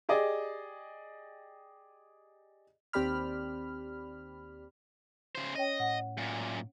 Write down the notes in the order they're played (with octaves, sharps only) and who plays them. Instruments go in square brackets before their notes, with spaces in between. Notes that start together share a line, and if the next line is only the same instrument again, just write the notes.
[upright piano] G4 G#4 D5 D#5
[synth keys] D#2 C4 G4 D5 B5 F6
[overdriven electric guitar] C#3 C5
[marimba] C#4 C#5 G5 [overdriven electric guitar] D#5
[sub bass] A2 [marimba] F#5
[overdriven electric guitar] F#2 A#2